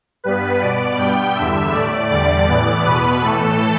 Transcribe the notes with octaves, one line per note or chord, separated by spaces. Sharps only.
G2 G3 B3 B4
B2 B3 D5
G2 G3 B3 G5
E2 D3 G3 E5
A2 A3 D5
E2 D3 G3 D5
A2 E3 B3
E2 B2 B3 B4
A2 E3 A3 A4